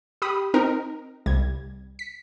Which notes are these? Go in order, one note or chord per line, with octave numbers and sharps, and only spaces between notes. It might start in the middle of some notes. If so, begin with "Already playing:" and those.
G4 B5 D#6
C4 D#4 A#4
C2 G3 G#6
B6